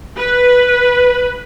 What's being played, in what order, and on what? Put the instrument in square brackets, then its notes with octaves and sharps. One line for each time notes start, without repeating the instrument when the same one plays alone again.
[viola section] B4